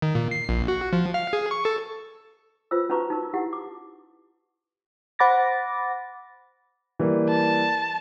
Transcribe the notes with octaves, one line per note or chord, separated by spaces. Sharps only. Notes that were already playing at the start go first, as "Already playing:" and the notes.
D#3
A#2
C7
A#1
F#4
F3
F5
G#4
C#6
A4
F4 B4 C5 E6
C#4 D#4 F#4 B4 A#5 C#6
D#4 A#4
E4 G4 F#5
D6
C5 F#5 B5 D6 A6 A#6
E3 G3 A#3
A5